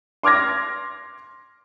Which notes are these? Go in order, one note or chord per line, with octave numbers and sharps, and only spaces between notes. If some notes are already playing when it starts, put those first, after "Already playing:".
C6 D6 F6 G#6 A#6